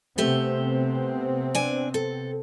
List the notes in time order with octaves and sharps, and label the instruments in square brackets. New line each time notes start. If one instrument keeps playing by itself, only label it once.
[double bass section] C3 B3 C4 [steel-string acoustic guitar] A3 G4 E5
[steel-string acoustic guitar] D4 G#5
A4